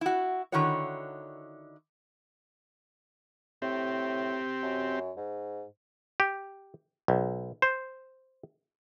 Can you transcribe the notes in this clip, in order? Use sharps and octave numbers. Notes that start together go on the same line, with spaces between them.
E4 F#4
D3 D#3 D#4 E4 F#4 C#5
A2 C4 G4
F#2
G#2
G4
B1
C5